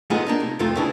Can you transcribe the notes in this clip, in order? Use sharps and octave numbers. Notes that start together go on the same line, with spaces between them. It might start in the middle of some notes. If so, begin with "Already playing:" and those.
G#3 A3 B3 D#4 F4 G#4
A#3 D4 D#4
C3
C2 F2 A3 F4
C#3 E3 D4